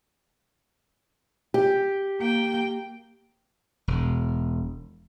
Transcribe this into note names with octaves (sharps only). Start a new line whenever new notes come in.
G4
A#3 G5
E1